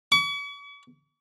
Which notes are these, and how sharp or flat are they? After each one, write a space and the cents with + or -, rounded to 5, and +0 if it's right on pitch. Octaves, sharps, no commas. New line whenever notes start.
C#6 +45